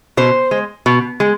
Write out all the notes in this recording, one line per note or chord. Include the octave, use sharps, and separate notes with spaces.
B2 C5
G#3
B2
G#3